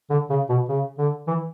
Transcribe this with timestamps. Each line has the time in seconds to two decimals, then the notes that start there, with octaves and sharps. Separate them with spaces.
0.10 D3
0.30 C#3
0.49 B2
0.69 C#3
0.98 D3
1.27 E3